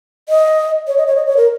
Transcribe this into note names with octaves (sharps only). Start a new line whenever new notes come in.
D#5
C#5
D#5
C#5
D#5
C#5
A#4